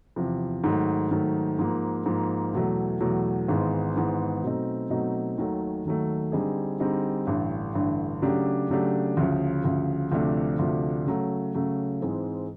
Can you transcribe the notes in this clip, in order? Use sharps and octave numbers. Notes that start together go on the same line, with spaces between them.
E2 C3 F3
G#2 D#3 F#3 A3
G#2 D#3 F#3 A3
G#2 F3 A#3
G#2 F3 A#3
E2 B2 F#3 A3
E2 B2 F#3 A3
G#1 G#2 E3 G#3 B3
G#1 G#2 E3 G#3 B3
B2 F#3 A3 C4 D#4
B2 F#3 A3 C4 D#4
D#2 D#3 F#3 A3
D#2 D#3 F#3 A3
D3 G3 C4 D#4 G#4
D3 G3 C4 D#4 G#4
A1 G2 D3
A1 G2 D3
C#3 F#3 A3 D4 G4
C#3 F#3 A3 D4 G4
D2 C#3 F3
D2 C#3 F3
D2 C3 F3 A3 D4
D2 C3 F3 A3 D4
C#3 F#3 A3
C#3 F#3 A3
G#2 E3 G#3 C4